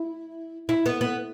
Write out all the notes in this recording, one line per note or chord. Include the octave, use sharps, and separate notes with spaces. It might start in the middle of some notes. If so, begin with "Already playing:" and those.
Already playing: E4
E4
B3
B3